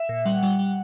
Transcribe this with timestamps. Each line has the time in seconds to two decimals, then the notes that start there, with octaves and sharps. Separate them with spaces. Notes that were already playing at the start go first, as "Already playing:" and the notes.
Already playing: E5
0.09 A#2
0.25 G3 F#5
0.43 G3
0.59 G3